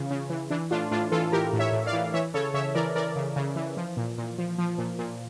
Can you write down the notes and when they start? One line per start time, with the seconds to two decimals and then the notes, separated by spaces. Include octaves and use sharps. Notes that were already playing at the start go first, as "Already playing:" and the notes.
Already playing: C#3 E3 F4
0.11 C#3
0.30 E3
0.50 E3 D4
0.71 A2 D4 F4
0.91 A2 D4 F4
1.12 E3 F4 A4
1.32 E3 G4 A#4
1.53 A2
1.59 C#5 E5
1.72 A2
1.86 D5 F5
1.93 E3
2.14 E3 C#5 E5
2.34 C#3 A4 C#5
2.54 C#3 C#5 E5
2.74 E3 A#4 D5
2.95 E3 A#4 D5
3.16 C#3
3.36 C#3
3.56 E3
3.77 F3
3.97 A#2
4.18 A#2
4.38 F3
4.58 F3
4.78 A#2
4.99 A#2